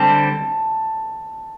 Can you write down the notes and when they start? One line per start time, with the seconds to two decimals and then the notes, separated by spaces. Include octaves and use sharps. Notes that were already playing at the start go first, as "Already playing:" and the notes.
Already playing: D3 G3 C4 G4 A5